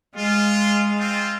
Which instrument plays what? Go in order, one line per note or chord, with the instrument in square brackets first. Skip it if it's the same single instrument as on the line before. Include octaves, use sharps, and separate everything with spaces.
[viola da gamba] G#3 [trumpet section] F4
[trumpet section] C4 F4